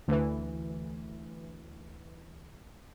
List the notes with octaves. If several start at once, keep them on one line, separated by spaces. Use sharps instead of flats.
D2 E3